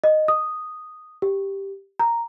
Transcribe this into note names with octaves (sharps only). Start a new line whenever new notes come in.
D#5
D#6
G4
A#5